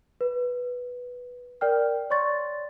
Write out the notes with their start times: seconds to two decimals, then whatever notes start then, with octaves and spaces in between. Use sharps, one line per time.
0.21 B4
1.61 A#4 D5 G5 F6
2.10 C#5 D5 C6 C#6 A6